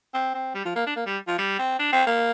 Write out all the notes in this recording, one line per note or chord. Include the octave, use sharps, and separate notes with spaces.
C4
C4
G3
F3
A#3
D4
A#3
G3
F3
G3
C4
D4
C4
A#3